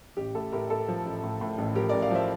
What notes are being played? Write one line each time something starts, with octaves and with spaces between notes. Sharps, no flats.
A1 G4
A2 A4
A2 G4 A#4
A2 A4
F3
A1
A2
A2
A1
F3 G4 A#4
A1 A#4 D5
D5 F5
F3 C5 E5